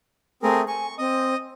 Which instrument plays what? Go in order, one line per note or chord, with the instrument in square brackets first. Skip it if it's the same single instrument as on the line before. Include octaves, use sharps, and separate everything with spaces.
[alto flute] A3 [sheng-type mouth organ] C4 G#4 A#4
[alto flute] G#5 [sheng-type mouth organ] C#6
[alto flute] C4 [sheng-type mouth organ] D#5 D#6